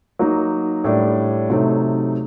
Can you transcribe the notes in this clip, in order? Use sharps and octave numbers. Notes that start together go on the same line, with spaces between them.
F#3 A#3 D#4
A2 G3 D4
C3 F#3 A3 D#4